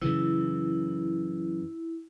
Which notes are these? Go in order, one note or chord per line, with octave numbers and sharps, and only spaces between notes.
F#2 C#3 E3 E4